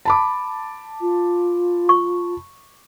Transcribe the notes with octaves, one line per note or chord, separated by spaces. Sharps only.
A5 B5 D6
F4
C#6